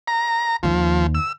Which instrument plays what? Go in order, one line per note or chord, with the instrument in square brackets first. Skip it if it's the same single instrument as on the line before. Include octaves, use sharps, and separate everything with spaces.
[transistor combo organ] A#5
[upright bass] D#2 A#3 [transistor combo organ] F3
[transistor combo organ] E6